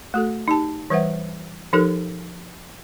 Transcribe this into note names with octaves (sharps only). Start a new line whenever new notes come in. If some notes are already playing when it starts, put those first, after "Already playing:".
A3 F#4 A4
D#4 G4 A5
E3 G3 B4 C5 E5 F#5
F3 D#4 G4 A4 A#4